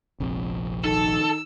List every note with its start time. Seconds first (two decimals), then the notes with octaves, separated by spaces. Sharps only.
0.20 F1 A#1 F2
0.84 D#3 A4 E6